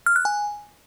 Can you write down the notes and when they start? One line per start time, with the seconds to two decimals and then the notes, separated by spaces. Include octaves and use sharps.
0.06 F6
0.16 F#6
0.25 G#5